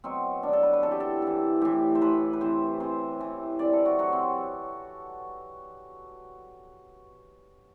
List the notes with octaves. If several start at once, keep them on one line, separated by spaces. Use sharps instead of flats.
B2 F#3 C4
B2 D4
F#3 A4
B4
B4
C3 E3 A4
G4
A4
C3 E3
A2 E3 G4
C5
A2 E3 B4
B4
C3 E3 C5
C3 E3 C5
C3 E3
C3 E3 D5
A4
F#4
C3 F#3 F#4
C4